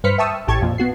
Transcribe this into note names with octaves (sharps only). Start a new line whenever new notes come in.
G2 B4 C5 F6 B6 C#7
E5 G5 A5 C#6 D#6 E6
A1 A2 G4 A5 C#6 G#6
F2 A#2 F3
B3 F#4 C7